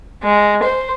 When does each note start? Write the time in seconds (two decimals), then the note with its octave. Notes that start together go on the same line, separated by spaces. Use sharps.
0.23 G#3
0.62 C5